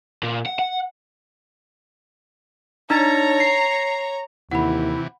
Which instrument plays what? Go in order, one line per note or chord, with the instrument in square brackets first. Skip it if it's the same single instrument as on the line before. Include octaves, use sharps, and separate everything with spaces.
[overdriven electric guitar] A#2
F#5
F#5
[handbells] D4 D#4 A6 [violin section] C#5 A#5
[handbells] C7
[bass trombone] D#2 [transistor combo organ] C3 E3 [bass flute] E4 [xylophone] F#5 B5